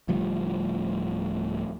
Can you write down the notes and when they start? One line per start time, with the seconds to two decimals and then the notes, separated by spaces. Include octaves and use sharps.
0.08 D1 D2 F3 G3